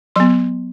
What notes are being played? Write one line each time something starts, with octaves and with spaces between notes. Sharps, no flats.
F#3 B3 C6